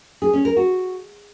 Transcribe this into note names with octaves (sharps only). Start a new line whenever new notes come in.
G#4
C#4
A#4
F#4